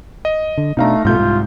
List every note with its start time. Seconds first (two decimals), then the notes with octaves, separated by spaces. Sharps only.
0.25 D#5
0.58 D3
0.77 B2 A3 C4 D4 D#4 F5 A#5
1.05 C2 G#2 B2 A3 F4 G6
1.19 G#2